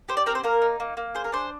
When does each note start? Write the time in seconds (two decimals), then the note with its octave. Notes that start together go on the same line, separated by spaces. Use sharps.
0.09 G4 C5
0.17 D5
0.26 C4 A#4
0.35 C5
0.44 A#3 A#4
0.62 D#4
0.80 A#3
0.97 A#3
1.15 G#4 C5
1.24 A#4
1.32 D4 C5